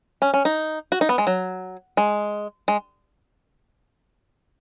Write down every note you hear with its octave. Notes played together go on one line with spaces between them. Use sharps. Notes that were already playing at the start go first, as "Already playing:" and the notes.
C#4
C#4
D#4
F#4
D#4
B3
G#3
F#3
G#3
G#3